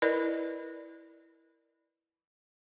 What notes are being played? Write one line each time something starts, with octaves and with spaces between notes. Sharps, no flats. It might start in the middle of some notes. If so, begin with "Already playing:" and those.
E4 A#4 B4 D5 D#5